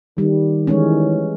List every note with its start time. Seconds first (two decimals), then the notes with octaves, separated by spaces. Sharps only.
0.18 D#3 G3
0.67 E3 G#3 C#4